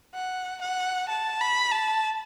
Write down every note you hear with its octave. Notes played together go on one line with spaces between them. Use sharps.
F#5
F#5
A5
B5
A5